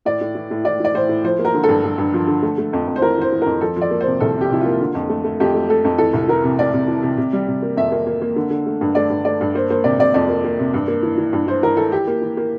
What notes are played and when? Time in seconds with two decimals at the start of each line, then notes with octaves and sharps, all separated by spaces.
0.05 A2 D5
0.21 A2
0.35 E3
0.51 A2
0.65 A2 D5
0.80 E3 D5
0.94 A2 C5
1.09 A2
1.24 F3 C5
1.39 A#3
1.45 A#4
1.54 D3
1.63 G2 A4
1.84 G2
1.98 G2
2.14 F3
2.28 D3
2.43 A3
2.58 A3
2.73 F2
2.88 F2
2.96 C5
3.02 E3 A#4
3.18 E3 C5
3.32 E3
3.42 F2 A#4
3.61 F3 A4
3.76 F3 D5
3.91 A#3
4.01 C5
4.06 C3
4.20 C2 A4
4.36 C3
4.41 G4
4.51 C3 E4
4.61 A#3 F4
4.81 D3
4.95 F2
5.09 A3
5.24 A3
5.40 F2 G4
5.55 A3
5.69 A3 A4
5.85 F2
5.98 E3 A4
6.13 C2
6.28 E3 A#4
6.44 C3
6.58 C3 D5
6.73 C3
6.88 E3
7.03 C3
7.17 C3
7.33 G3
7.47 C3
7.62 A#3
7.77 F2 E5
7.92 A#3
8.07 A#3
8.22 A#3
8.36 D3
8.50 D3
8.66 A3
8.81 G2
8.95 A3 D5
9.10 G2
9.25 A3 D5
9.41 G2
9.55 A#3 C5
9.70 A#3 C5
9.84 C3 D5
9.99 C3 D5
10.14 F2 D5
10.28 A#3
10.44 A#3
10.59 C3
10.74 G2
10.88 A#3
11.03 E3
11.18 E3
11.33 G2
11.47 E3 C5
11.63 E3 A#4
11.77 E3 A4
11.92 E3 G4
12.07 A#3
12.22 E3
12.37 A#3